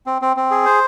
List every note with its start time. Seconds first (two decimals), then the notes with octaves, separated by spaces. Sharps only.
0.06 C4
0.22 C4
0.37 C4
0.51 G#4
0.66 C5